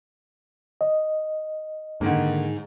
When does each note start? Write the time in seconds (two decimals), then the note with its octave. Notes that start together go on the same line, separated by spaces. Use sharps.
0.81 D#5
2.01 G#2 D3 D#3 A#3